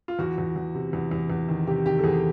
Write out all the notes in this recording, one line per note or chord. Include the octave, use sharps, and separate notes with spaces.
F4
E2 F#4
E2
E2
C3
E2
E2
E2
D#3
C3 G4
D#3 G4
A4
E2 G#4